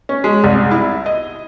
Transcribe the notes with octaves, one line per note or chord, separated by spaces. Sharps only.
C#4
G#3
C2
E4
D#5